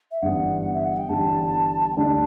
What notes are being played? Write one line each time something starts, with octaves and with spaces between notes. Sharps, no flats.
E5
G1 G2 E3 G3 B3 F#5
E5
F#5
G5
G1 G2 E3 G3 B3 A5
G5
D2 D3 G3 D4 A5